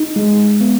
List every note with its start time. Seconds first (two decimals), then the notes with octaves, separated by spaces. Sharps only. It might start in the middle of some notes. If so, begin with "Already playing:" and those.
Already playing: D#4
0.16 G#3
0.61 B3